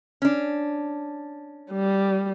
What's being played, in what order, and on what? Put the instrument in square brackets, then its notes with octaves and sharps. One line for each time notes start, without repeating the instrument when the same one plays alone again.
[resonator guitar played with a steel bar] C#4 D4
[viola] G3